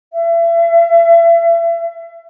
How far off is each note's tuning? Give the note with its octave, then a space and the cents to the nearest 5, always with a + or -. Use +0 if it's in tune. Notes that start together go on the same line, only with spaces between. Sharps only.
E5 +35